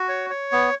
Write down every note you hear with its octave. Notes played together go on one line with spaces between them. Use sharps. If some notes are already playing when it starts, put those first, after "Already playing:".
Already playing: F#4
C#5
C#5
B3